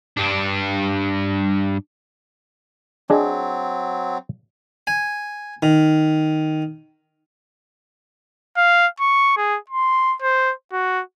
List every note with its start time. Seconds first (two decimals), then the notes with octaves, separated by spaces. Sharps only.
0.17 G2 D4
3.10 F#3 C4 D4 G#4 D#5
4.87 G#5
5.63 D#3
8.57 F5
9.00 C#6
9.37 G#4
9.69 C6
10.22 C5
10.72 F#4